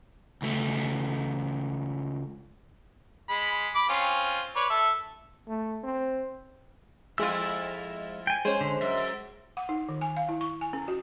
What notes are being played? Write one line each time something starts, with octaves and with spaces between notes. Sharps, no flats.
C#2 A3
G#3 B5
B5 D6
C4 C#4 F4
B4 C#5 D5
A4 E5
A3
C4
F2 G#3 E4 F4 E5 E6
G5 G#5
G#3 C#4 C5 G#5
D3
F#2 E5
F#5
D#4
D#3
G#5
F5
E4
C#6
G#5
C#4
F#4